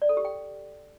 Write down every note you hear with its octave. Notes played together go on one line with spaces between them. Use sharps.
D5
A4
G4
G5